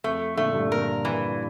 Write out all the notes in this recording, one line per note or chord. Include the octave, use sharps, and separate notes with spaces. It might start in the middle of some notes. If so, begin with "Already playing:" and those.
F2 A3
A#2 D3 A3
G2 A#2
A#2 D3 A#4
E3